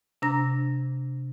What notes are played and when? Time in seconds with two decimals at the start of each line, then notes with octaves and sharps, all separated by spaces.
0.22 C3 D4 A#5 A#6